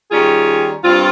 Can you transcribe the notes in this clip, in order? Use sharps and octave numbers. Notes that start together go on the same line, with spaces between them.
D#3 G3 C#4 F4 G#4
G2 G3 C4 F4